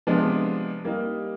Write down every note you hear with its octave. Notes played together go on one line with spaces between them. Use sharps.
C3 F3 G#3 B3 D4
G3 A#3 D#4